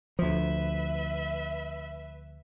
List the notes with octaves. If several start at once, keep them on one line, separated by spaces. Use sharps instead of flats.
D2 F3 B4 E5